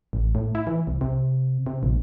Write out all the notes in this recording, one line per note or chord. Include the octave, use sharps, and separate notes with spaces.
A1
A2
E4
E3
C2
C3
C3
A#1